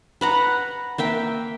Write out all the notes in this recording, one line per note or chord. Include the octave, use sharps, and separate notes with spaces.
B4 F#5 A#5
A#3 E5 G5